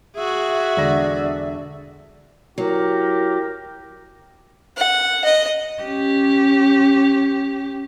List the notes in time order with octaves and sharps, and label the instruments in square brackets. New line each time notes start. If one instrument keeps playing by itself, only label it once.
[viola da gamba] F#4 G#4 [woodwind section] E5
[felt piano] E1 D3 A#6 [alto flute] D5
[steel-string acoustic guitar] F#3 [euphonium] E4 [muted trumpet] G4 [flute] A#4
[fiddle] F#5
D#5
[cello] C#4 G4